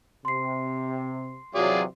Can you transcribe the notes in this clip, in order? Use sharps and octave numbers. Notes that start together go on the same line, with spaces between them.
C3 C6 C7
C3 E3 F#3 F4 G#4 D5